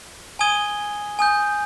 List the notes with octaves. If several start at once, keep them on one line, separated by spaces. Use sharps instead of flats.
G#5 D#6 G#6 D#7 G7
G#5 D#6 G6